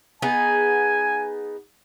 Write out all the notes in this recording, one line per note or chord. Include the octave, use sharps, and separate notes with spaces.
B3 D#4 G#4 G#5